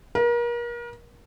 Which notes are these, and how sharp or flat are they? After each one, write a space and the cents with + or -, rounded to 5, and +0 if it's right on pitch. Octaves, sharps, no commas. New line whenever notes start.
A#4 +35